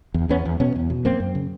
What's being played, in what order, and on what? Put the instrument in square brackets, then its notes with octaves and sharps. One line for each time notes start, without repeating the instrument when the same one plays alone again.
[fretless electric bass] E2
E2 B3 C#4
E2
B2 B3 C#4
E2
B2
F#2 A#3 C4
F#2
C#3